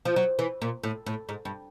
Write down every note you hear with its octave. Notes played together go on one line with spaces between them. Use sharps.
F3
F#3
E3
A#2
A2
A2
G#2
G2